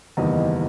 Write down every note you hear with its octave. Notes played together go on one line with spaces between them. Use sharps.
F#1 E2 D#3 G3 D#5